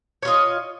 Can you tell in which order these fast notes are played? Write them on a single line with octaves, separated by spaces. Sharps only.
C#5 F4 D#5